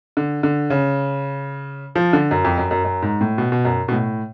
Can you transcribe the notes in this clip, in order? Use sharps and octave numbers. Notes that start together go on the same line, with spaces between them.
D3
D3
C#3
F3
D3
F#2
F2
F#2
F#2
F#2
G#2
A2
B2
B2
F#2
B2
A2